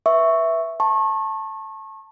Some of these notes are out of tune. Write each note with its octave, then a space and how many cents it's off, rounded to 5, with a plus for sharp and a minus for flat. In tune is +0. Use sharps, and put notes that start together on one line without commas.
B4 -20 E5 +0 C#6 +0
A5 +5 C#6 -30